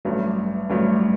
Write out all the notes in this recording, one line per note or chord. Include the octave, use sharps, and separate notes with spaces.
A1 G2 F#3 A3
A1 G2 F#3 A3